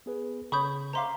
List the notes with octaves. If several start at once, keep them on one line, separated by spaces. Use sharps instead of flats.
B3 G#4 B4
C#3 C#5 B5 C#6 D#6 G6
C5 E5 F5 A#5 C6 D6